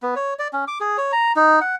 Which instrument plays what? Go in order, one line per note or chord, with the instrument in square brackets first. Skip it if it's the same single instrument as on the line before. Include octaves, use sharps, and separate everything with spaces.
[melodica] B3
C#5
D5
C#4
D6
G#4
C#5
A#5
D#4
F#5